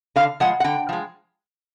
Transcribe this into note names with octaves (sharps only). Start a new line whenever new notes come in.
D3 F5
F3 G#3 F#5
F#5
D3 G5
F3 G#3